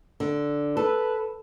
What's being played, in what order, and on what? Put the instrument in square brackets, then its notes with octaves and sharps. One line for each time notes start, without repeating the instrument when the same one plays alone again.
[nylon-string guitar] D3
[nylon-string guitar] A4 [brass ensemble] B4